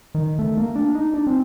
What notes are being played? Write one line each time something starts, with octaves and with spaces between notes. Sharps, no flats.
D#3
A3
A#3
D4
D#4
D4
C4